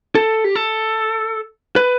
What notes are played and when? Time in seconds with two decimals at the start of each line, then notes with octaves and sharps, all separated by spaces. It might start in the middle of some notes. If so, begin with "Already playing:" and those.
0.15 A4
0.44 G4
0.55 A4
1.76 B4